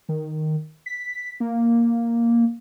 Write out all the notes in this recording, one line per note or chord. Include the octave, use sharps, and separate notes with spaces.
D#3
B6
A#3